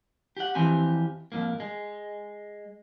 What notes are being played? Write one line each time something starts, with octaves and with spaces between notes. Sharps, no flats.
G4 F#5
F2 E3 C4 G4 G#5
F2 G#2 A#3
G#3